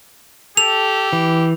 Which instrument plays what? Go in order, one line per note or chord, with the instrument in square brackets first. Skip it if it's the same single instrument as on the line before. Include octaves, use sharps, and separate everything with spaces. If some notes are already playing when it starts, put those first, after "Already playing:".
[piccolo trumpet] G4 [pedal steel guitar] A4 [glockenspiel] F7
[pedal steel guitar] E3